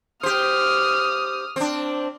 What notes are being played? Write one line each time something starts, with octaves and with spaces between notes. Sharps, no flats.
G4 C5 D#6 F6
C4 D4